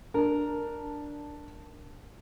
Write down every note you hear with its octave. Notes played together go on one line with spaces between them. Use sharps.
D4 A#4